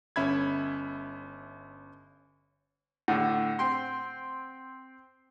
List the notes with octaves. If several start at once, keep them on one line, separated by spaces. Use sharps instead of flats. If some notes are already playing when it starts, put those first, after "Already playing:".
G1 C#4 E5 B5 G#6
A2 D3 F#5
C4 G5 C6